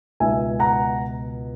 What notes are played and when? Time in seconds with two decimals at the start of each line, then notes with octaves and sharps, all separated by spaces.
0.20 C#2 B2 G#3 E5 G#5
0.60 F#5 A#5